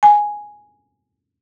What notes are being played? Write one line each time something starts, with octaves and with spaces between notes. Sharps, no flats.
G#5